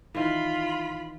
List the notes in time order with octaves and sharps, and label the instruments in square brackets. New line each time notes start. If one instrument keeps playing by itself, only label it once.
[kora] D#3 E3 [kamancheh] F4 B5